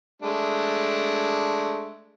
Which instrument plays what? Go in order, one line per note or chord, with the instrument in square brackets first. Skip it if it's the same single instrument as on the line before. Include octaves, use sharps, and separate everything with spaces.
[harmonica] G#3 A3 D4